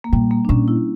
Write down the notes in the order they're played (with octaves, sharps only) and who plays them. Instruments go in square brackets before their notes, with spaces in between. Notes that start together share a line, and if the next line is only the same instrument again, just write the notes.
[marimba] A#3
[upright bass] A#2 [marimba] G3
[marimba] A#3
D4
[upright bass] A#2 [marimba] C#4
[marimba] E4